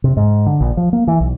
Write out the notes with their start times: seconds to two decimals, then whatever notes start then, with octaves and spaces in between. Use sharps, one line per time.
0.04 C3
0.17 G#2
0.46 D3
0.61 A#1
0.77 F3
0.93 A#3
1.07 E3
1.20 B1